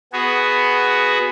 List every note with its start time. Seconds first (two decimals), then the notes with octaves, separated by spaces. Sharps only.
0.13 B3 F#4 G#4